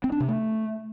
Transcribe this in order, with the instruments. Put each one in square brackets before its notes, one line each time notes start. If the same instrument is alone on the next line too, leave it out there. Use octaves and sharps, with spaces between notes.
[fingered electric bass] C4
D4
C3
A3